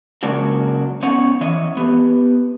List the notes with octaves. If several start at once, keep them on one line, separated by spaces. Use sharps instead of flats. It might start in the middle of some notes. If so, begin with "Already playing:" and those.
C#3 F#3 G#3 A#3 D4 F#4
B3 C#4 D#4 C#5 F#5
E3 C#5 D#5 E5
B3 G4 B4